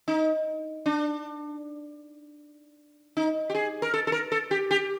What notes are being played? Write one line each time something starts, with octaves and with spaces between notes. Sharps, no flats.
D#4
D4
D#4
G4
G#4
A#4
A4
A4
A#4
A4
G4
G4